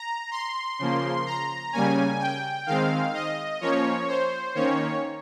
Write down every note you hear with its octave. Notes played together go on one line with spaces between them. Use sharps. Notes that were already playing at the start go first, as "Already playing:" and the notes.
Already playing: A#5
C6
C#3 F3 A#3
A#5
C#3 G3 A#3 C#4 G#5
G5
D#3 G#3 C4 F5
D#5
F3 A#3 C#4 C#5
C5
D#3 A#3 C#4 C#5